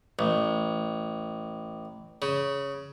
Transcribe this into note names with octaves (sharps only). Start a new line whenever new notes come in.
A1
C#3